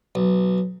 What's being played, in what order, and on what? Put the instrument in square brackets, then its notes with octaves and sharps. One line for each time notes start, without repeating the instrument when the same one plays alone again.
[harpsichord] B1